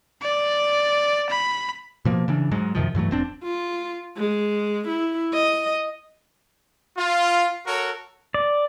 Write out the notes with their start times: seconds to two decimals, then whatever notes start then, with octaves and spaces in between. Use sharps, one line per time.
0.22 D5
1.29 B5
2.05 B2 F3 A#3
2.28 C#3 E3 D4
2.51 G#2 F#3 G#3
2.75 F#2 C3 D#3 F3
2.95 G2 E3 F#3 A3
3.11 E1 C4 D4
3.43 F4
4.17 G#3
4.88 E4
5.33 D#5
6.97 F4
7.66 F#4 A4 A#4 C#5
8.34 D5